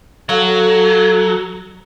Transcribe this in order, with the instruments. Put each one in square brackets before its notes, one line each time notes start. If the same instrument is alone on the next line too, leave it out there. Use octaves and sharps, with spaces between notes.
[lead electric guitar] F#3 [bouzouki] A4 F5